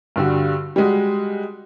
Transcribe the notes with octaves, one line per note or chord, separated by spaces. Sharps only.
G2 D3 G3 F#4
G3 G#3 F#4